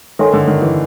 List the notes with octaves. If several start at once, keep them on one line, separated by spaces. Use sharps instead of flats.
D#3 A4 C#5 E5 G#5 C6
D3
D#3
E3